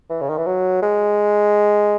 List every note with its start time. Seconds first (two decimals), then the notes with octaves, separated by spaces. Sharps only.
0.10 E3
0.21 C#3
0.29 D#3
0.38 E3
0.46 F#3
0.82 G#3